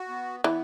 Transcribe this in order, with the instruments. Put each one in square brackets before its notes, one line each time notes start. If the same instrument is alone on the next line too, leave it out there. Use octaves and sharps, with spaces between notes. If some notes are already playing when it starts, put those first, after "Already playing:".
Already playing: [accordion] F#4
B3
[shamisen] E3 [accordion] B3